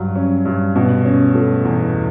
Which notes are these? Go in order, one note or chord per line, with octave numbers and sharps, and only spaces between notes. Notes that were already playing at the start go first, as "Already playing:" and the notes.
Already playing: G2 F#3
C#4
G2
B2
C#4
A3
E2